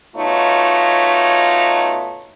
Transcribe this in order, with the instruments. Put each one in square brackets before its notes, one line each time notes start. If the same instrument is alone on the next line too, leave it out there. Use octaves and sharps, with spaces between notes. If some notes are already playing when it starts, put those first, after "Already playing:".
[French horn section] B2 A3 D#4 F4 C#5